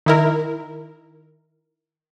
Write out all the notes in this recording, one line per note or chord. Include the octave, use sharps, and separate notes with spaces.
D#3 E4 A#4